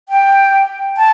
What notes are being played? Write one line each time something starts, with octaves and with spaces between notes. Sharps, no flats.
G5
A5